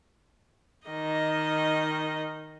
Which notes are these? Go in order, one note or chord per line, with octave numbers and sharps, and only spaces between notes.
D#3 D#5